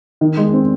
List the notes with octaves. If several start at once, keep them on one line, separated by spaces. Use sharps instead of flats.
D#3
G#3
C4